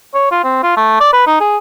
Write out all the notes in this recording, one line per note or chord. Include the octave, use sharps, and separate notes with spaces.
C#5
F4
C4
F4
A3
D5
B4
D#4
G#4